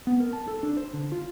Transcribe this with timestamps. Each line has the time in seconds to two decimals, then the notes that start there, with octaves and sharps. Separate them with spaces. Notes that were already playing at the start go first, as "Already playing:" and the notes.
0.07 B3
0.20 A#4
0.33 A5
0.48 A4
0.63 D4
0.77 C5
0.93 D3
1.12 F4